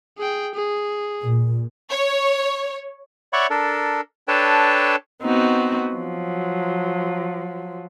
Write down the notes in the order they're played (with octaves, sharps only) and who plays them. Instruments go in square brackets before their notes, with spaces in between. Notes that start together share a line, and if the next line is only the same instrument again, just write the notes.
[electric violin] G#4 G5
G#4
[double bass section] A#2
[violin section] C#5
[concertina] C#5 D5 E5 F#5 B5 C#6
D4 A4 A#4
D4 A4 B4 C#5 G5 A5
[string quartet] B3 C4 D#4 F#4
F3 F#3